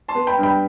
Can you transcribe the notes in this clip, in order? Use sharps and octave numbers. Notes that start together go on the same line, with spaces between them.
A5 C6
B3
G5 B5
G2
G5 B5